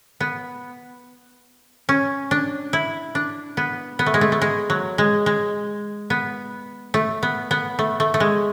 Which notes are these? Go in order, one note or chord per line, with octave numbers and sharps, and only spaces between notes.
B3
C#4
D4
E4
D4
B3
B3
A3
G#3
A3
A3
G#3
F#3
G#3
G#3
B3
A3
B3
B3
A3
A3
A3
G#3